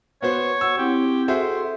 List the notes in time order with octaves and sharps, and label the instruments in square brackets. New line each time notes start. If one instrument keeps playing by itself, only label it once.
[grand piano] B3 F#4 C5 [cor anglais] C#5
[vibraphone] F#4 F#5 [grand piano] E6
[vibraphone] C4 E4 [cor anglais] G4
[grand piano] F#4 G#4 E5 [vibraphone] A4 [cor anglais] C5